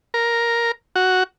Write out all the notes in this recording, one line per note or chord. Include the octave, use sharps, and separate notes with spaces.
A#4
F#4